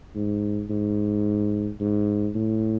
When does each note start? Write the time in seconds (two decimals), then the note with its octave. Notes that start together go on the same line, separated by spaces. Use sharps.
0.15 G#2
0.70 G#2
1.80 G#2
2.35 A2